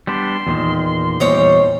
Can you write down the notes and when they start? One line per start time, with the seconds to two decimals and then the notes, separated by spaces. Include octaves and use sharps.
0.07 G3 B3 D4 C6
0.47 E2 A#2 D#3
1.20 E2 A#2 G3 D#4 C5 C#5